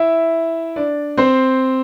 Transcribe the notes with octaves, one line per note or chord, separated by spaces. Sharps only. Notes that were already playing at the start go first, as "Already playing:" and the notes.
Already playing: E4 E5
D4 D5
C4 C5